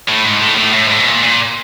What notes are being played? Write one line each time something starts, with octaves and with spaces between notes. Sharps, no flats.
A2
G#2
A2
A2
A2
G#2
A2
B2
A#2
A#2